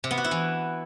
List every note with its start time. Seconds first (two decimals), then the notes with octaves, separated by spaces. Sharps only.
0.04 C3
0.11 B3
0.17 F#4
0.24 E4
0.31 E3